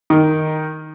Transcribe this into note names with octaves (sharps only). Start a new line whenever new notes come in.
D#3 D#4